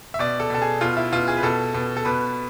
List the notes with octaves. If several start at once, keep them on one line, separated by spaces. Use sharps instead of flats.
E5
B2 D5
A4
B2 A4
G#4
B2 F4
E4
B2 F4
G#4
B4
B2 A4
B2
A4
B2 B4